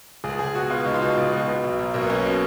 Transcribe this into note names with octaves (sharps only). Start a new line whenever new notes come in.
C#2 G#4
C#2 G#4
B2 F#4
B2 F4
C#2 D#4
F4
B2 D#4
C#2
B2
B2
B1
B1
B1 A#3
B3
B2 C#4
B2